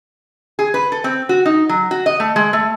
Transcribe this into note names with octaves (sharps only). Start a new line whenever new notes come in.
G#4
B4
A4
C4
F#4
D#4
F#3
F#4
D#5
A3
G#3
A3